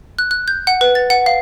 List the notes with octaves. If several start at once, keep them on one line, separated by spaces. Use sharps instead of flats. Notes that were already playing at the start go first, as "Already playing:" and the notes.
F#6
F#6
G6
F#5
B4
A6
F#5
F5